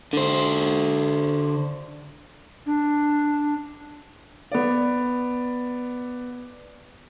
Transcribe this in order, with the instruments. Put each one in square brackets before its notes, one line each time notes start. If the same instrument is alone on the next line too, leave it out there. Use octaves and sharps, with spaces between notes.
[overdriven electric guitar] D3 C5
[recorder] D4
[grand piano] B3 D5